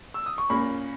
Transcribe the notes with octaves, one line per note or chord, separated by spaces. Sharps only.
E6
D#6
C#6
A#2 A#3 C#4 B5